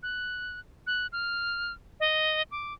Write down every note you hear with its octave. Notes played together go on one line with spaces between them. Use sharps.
F#6
F#6
F6
D#5
D6